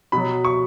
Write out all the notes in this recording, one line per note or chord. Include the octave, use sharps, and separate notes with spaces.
B2 F#3 B5
C#6